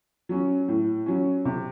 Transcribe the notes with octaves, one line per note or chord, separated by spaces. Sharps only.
F#3 C#4
A2
F#3 C#4
C3